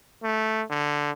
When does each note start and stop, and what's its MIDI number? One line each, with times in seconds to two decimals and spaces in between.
0.23 0.62 57
0.70 1.11 50